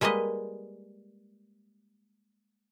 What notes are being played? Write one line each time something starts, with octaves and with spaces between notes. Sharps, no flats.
G3 G#3 A#3 B4 D#5